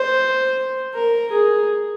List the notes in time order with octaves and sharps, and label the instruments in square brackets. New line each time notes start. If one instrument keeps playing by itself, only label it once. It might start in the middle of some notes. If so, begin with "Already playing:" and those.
Already playing: [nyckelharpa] C5
A#4
G#4